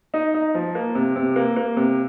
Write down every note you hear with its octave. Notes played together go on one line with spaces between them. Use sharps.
D#4
D#4
F3
A#3
C3
C3
A#3
A#3
C3